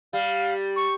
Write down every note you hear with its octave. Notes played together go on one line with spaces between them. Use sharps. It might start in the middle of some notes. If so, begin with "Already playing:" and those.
G3 F5
C#6